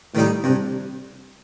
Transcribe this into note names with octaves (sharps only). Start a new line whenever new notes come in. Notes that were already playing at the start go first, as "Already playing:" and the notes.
A2 D#3 G3 D#4
G2 C3